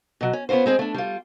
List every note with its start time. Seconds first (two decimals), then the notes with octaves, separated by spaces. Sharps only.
0.21 B2 F#3
0.33 C#4
0.49 B3 C#4 F4 F#4 C5
0.66 G#3 C4 G#4
0.79 A3 D4
0.94 G3 F4